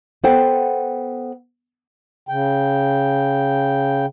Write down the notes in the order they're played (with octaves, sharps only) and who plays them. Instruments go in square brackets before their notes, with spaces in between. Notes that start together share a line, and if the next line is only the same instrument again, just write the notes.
[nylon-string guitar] B3 A4 C5 F#5 G5
[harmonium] C#3 G5